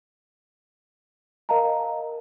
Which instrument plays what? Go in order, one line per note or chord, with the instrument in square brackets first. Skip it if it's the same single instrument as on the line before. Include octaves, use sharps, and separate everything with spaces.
[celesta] A#4 D#5 F5 A5 A#5